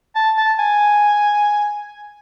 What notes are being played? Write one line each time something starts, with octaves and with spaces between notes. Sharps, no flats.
A5
A5
G#5